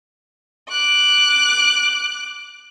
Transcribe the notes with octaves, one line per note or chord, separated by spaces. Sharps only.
D6 F#6